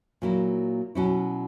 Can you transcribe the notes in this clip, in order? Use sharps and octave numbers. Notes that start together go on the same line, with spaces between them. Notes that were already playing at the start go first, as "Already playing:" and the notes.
A#2 F#3 A#3 E4
B2 F#3 C#4 E4